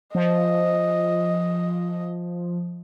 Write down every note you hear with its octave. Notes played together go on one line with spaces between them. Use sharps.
F3 D#5